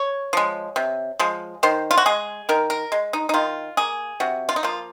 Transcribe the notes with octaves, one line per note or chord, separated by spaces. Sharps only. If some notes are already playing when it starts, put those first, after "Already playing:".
Already playing: C#5
F3 G#3
C3
F3 G#3
D#3 C5
F4
F#4
G#3 G#4
D#3 A#4
A#4
G#3
D#4
D#4
D#3 F4
A#3 G#4
C3 F#4
F4
D#4
F3 A#3 F4